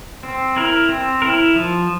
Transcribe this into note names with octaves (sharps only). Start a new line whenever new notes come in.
C4
E4 A#4
C4
E4 A#4
F3